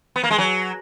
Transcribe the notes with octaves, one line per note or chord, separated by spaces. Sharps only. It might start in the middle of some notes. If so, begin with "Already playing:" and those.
B3
A#3
G#3
F#3